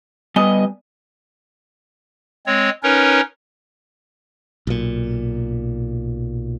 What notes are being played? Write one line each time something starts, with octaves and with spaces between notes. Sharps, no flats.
G3 B3 D#5 G#5
G#3 C4 C#5
C#4 D#4 A#4 B4 C#5
B1 A#2